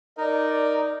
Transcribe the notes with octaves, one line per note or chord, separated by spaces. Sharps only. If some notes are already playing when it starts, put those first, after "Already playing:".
D#4 A#4 D5